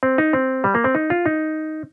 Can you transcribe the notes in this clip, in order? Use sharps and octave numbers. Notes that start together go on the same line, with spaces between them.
C4
D#4
C4
G3
A#3
C4
D#4
F4
D#4